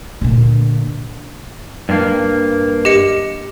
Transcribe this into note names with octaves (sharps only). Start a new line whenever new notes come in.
A#2 D3
G2 A#3
G4 D#5 C#7